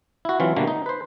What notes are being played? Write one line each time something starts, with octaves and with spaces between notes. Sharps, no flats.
E4 F#4
E3 F#3 C4 F4
B2 D3 G3 A3 A#3
D#4
B4 C5